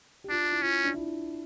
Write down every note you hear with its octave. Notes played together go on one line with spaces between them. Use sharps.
G4
D4 F4
E4
C#4 F4
D4
E4